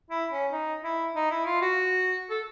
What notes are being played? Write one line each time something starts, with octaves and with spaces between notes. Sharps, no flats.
E4
C#4
D#4
E4
D#4
E4
F4
F#4
A4